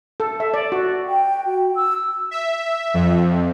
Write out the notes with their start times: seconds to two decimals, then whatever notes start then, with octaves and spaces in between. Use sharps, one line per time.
0.20 A4
0.40 E5
0.54 D5
0.72 F#4
1.06 G5
1.46 F#4
1.76 E6
2.31 E5
2.94 F2